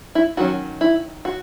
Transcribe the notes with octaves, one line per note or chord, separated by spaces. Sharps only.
E4
D#3 F#3 C#4 F#4
E4
F#4